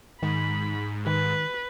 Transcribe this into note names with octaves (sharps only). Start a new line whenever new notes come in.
G#2 D#3 B5
D#3 B4